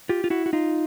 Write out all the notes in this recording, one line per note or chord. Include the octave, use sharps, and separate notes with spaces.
F4 G4
F4
E4 F#4
F#4
D#4 F4